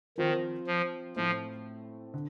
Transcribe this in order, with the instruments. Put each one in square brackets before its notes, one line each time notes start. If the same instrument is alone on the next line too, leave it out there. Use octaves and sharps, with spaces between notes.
[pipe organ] D#3 [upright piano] F3 C4 F4 C5
[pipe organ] F3
[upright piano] A2 A3 C4 [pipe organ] F3
[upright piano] D3